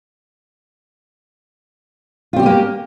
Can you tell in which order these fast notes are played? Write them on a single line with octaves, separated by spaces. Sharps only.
F4 C4 G4 C#4 A#3